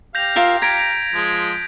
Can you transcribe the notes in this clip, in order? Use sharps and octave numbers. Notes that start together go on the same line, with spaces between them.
G4 F5 G6 A#6 F7
F4 A#4 E5
A#5 G#6 B6 D7
F3 G#3